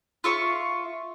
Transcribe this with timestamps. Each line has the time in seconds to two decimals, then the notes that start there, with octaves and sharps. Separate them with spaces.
0.24 F4 E5 C#6